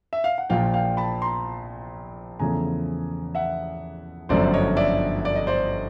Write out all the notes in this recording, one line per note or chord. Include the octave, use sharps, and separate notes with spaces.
E5
F5
F#5
A#1 A#2 F3 F5 G5
F5 G5
A5 B5
A#5 C6
E2 C#3 F3 A3 G#5 A#5
E5 F#5
G1 F#2 D3 F3 A3 C5 D5
C#5 D#5
D5 E5
D5
D#5
C5 D5